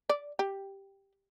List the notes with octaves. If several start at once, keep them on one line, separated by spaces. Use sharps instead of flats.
D5
G4